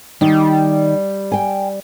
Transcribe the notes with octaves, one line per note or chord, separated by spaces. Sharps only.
D#3 G3 D#4
G5 G#5